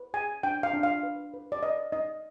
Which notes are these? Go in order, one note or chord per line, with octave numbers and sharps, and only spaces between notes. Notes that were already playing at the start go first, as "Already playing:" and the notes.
Already playing: B4
G#4 G#5
D4 G5
F5
D4
F5
B4
B4
D5
B4 D#5
D#4 D#5